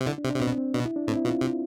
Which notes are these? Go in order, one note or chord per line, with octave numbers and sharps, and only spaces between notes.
C3
D3 E4
D4
C3
D4
C3
B2 C4
C4
B2 D4
E4
D4
A2 C4
E4
B2 F4
C3